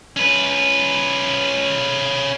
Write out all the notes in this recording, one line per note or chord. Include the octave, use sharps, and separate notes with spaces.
C#4 B4